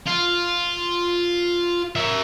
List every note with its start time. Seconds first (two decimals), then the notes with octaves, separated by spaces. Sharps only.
0.06 F4
1.96 A#4 E5